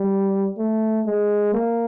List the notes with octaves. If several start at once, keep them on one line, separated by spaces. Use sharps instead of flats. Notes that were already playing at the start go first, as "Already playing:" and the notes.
Already playing: G3
A3
G#3
A#3